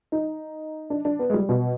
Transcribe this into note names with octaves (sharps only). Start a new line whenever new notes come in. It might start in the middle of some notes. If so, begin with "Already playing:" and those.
D#4
D4
D4
B3
G#3
G3
B2